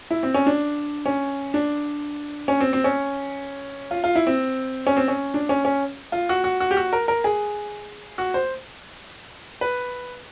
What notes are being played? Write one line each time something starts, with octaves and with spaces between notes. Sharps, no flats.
E4
C4
C#4
D4
C#4
D4
C#4
C4
C4
C#4
F4
F4
E4
C4
C#4
C4
C#4
D4
C#4
C#4
F4
F#4
F#4
F#4
G4
F#4
A#4
A#4
G#4
F#4
C5
B4